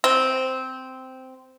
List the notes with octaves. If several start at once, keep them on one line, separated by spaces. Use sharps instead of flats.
C4